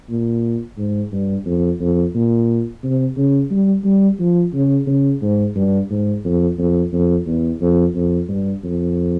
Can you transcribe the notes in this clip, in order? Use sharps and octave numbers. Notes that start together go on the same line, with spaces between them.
A#2
G#2
G2
F2
F2
A#2
C3
C#3
G3
G3
F3
C#3
C#3
G#2
G2
G#2
F2
F2
F2
E2
F2
F2
G2
F2